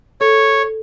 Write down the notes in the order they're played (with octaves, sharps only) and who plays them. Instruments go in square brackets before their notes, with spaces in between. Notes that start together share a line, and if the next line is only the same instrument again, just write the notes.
[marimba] A4 [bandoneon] C#5